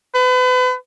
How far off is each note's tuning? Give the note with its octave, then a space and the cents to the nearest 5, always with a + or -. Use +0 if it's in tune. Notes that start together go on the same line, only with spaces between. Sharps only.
B4 +35